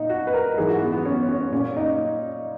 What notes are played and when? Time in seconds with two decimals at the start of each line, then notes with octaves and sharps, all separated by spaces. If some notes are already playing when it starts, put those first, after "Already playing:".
Already playing: A#2 D#4
0.09 F#4
0.27 B4
0.34 A#4
0.58 G#2 E3 G#4
0.69 F#4
0.82 B3
0.93 B3
1.05 C#4
1.29 C#4
1.52 A#2 C#4
1.77 D#4